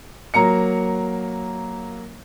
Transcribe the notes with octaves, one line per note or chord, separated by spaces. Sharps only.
F#3 A#3 A#5 C#7